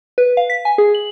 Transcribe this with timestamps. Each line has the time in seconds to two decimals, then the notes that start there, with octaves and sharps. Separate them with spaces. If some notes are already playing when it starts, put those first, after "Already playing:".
0.18 B4
0.37 F5
0.50 B6
0.65 G#5
0.78 G#4
0.94 F#7